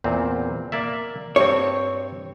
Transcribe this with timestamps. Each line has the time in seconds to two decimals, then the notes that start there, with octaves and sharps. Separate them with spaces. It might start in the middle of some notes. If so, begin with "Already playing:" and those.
0.04 E2 A#2 C4
0.72 A#3 D5 E5
1.36 G2 C4 C#5